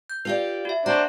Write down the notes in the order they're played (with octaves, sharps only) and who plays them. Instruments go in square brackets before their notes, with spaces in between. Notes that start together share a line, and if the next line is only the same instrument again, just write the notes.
[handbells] G6
[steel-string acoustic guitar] F4 G4 D5 [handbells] B4 F5
[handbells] F#4 E5
[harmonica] D4 C5 [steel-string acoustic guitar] F#4 [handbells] A#5